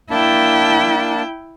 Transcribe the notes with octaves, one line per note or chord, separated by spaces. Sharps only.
A#3 D4 E4 G5 A5